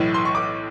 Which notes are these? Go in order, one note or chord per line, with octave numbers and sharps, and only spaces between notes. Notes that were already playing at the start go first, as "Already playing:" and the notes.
Already playing: B1 A2 E3
C6
C#6
D6